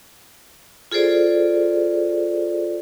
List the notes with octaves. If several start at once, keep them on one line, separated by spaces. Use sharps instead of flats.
F4 G#4 A4 C5 D5